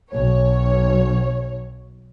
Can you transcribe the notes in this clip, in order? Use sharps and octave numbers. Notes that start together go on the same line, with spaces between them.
B1 C#5